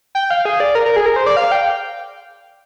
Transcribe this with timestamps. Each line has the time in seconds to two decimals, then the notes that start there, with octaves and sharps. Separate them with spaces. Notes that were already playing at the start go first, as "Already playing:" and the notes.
0.15 G5
0.30 F5
0.45 G#4
0.60 D5
0.75 A#4
0.85 A#4
0.96 G#4
1.06 A#4
1.16 C5
1.26 D5
1.37 F5
1.52 G5